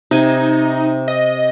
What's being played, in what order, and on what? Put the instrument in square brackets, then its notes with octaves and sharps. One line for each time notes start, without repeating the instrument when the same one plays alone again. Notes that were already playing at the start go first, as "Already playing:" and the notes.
[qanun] C3 G#5 [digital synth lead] D#4
[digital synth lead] D#5